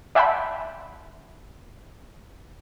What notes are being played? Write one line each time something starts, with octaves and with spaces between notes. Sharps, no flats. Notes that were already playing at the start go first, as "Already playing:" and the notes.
D5 E5 F#5 G5 A5 B5